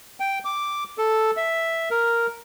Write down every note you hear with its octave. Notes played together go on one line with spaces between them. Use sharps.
G5
D6
A4
E5
A#4